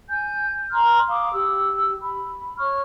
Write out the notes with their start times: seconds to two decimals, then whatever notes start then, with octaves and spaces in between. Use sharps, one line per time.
0.08 G#5 G6
0.71 A#5 C6 F6
1.08 F5 D6 D#6
1.32 G4 E6
2.00 B5
2.58 C#5 C#6 F6